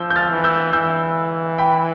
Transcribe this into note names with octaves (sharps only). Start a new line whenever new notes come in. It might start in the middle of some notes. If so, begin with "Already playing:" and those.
Already playing: F3 E6 G6
G6
F6 A6
E3
E6 G6
E3 E6 G6
G5 B5